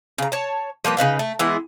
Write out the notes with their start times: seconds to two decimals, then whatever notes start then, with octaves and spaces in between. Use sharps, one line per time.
0.18 C#3 A#5
0.32 C#5 A5
0.84 F3 G3 A#3 B4
0.97 C#3 D#4 B4 F5
1.19 A3
1.39 E3 G#3 B3 E4